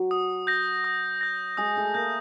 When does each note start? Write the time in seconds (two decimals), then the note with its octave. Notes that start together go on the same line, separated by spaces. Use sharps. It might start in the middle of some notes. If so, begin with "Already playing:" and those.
Already playing: F#3 F#4
0.11 D#6
0.47 G6 A#6
0.84 D#6
1.21 G6 A#6
1.57 G#3 G#4 D#6
1.76 A3 A4
1.94 A#3 A#4 G6 A#6